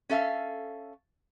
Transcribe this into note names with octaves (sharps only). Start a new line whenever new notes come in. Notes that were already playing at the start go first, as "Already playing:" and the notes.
C#4 A4 E5 F5